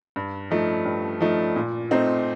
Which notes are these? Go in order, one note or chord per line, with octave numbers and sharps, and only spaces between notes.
G2
F3 A3 D#4
G2
F3 A3 D#4
A#2
A3 C4 D#4